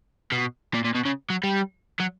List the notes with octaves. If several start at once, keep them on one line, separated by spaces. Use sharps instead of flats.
B2
A#2
A#2
B2
C#3
F#3
G3
F#3